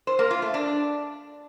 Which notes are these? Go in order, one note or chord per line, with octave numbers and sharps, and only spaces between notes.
C5
A#3
F4
A3
D4